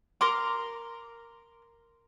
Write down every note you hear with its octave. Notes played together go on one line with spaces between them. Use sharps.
A#4 C6 D6